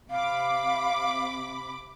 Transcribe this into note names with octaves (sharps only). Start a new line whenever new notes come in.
C3 F5 B5 D6